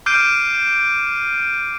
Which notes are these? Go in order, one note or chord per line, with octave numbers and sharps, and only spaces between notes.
D6 F6 G6 C7 D7 D#7